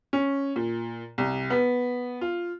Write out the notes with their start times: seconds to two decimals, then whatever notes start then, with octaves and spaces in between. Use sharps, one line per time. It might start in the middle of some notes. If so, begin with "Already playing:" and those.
0.13 C#4
0.56 A#2
1.18 C2
1.50 B3
2.21 F4